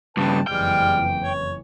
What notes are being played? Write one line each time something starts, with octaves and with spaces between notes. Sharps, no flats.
G2 C#3 B4 G5 A5
F#1 F2 E3 G3 G#3 G5 F6
C#5